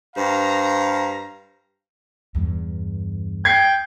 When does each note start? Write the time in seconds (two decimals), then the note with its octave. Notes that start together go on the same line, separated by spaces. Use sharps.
0.16 G2 C5 F5 A#5
2.35 E2 G2
3.45 G5 G#6 C7